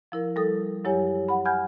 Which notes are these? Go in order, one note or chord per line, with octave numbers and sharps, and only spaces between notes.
F3 E4 A#4
G3 A4 D#6
F#2 F#3 E4 G4 C#5 G#5
F#5 B5
F#5 G#5 B5 F6 G6 G#6